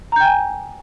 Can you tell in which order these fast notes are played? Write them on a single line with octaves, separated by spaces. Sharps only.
A#5 G6 G5 G#5